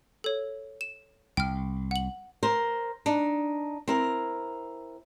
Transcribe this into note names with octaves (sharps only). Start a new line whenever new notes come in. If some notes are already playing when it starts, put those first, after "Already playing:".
A4 C#5
E7
C2 G5 F6
F#5 F#7
A#4 C5
D4 D#4
C4 E4 A#4